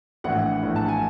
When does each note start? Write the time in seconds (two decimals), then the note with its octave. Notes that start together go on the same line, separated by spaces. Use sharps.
0.24 A#1 A2 E3 F#5
0.62 A#1 A2 E3
0.76 A5
0.88 G#5